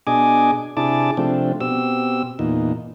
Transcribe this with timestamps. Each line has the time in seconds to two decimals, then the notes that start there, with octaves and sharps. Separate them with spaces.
0.07 B2 D4 G#4 D#5 G#5 D6
0.77 C3 D4 E4 G#4 A5 D6
1.17 C3 F3 A3 C4 D4
1.61 B2 C4 G4 E6
2.39 E2 A#2 D#4